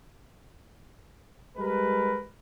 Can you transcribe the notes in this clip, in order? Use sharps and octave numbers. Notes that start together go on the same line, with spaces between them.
G3 G#3 G4 A#4 B4